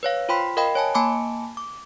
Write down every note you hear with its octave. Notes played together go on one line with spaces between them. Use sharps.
B4 C#5 F5
F4 C5 G5 B5 C6 B6
A#4 D#5 F5 G5 B5
C#5 G#5 A5
A#3 G#5 A5 B5 D6
D6